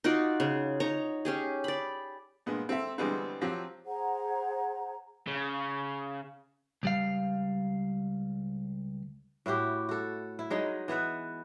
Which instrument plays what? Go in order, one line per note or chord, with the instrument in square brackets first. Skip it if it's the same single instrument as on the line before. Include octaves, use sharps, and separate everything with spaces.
[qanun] D#4 F4 F#4 D5
C#3
D#4 C#5 A#5
C#4 G4 G#4
D5 B5
[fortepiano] G2 A#2 G#3 B3
C4 A4 E5
D3 E3 G3 G#3 B3 C4
F3 F#3 C4 G4
[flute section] G#4 C5 F#5 A#5
[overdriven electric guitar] C#3
[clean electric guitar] C#2 G3 F5
[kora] A2 E4 F#4 G4
F#4 A4
E4
F#3 G#3 D#4
E3 B3 E5 F#5